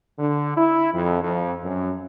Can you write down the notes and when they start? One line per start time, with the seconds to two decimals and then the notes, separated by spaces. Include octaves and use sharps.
0.18 D3
0.56 E4
0.93 F2
1.23 F2
1.64 F#2